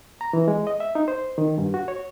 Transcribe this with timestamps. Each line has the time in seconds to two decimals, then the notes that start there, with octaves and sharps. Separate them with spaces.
0.21 A#5
0.33 E3
0.48 G#3
0.67 D#5
0.80 E5
0.95 D#4
1.08 C5
1.38 D#3
1.58 G2
1.74 F#4
1.88 C#5